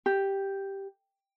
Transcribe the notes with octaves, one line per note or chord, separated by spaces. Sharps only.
G4